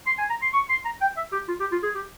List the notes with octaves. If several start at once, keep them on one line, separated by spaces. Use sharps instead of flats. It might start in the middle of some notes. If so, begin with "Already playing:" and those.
C6
G#5
A#5
C6
C#6
C6
A#5
G5
E5
G4
F4
G4
F4
G#4
G4